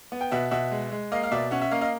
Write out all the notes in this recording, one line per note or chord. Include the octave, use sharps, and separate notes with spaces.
B3
G5
B2 E5 F#5
B2 E5 F#5
G#3
G#3
A#3 D#5 F5
F5
B2 D5 E5
C#4 E5 F#5
E5 F#5
A#3 D#5 F5
D#5 F5